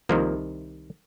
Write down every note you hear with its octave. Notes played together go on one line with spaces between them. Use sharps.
C2 C3 D#3 F3 A#3